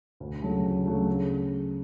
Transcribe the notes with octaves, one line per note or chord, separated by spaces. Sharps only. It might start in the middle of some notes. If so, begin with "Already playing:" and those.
D2
C#3 F#3 A3
D2
C#3 F#3 A3
C#3